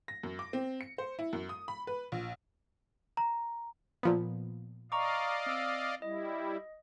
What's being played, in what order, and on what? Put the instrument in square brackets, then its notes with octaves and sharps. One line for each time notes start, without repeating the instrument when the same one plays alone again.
[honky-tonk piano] A#6
F#2
D6
C4
C#7
C5
E4
F#2
D#6
B5
B4
A#1
[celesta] A#5
[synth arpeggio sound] A#2 F3 B3
[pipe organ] D5 D#5 F5 [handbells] A#5 C#6 D6
[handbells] C4 E6 D7
[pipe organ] G3 E4 [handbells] D#5